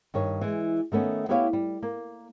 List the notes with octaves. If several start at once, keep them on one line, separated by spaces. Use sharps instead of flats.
G2 D#3 C#5
E3 G#3
D#3 A3 B3 C#4
B3 E4 G4 B4 C#5 F5
G3
A#3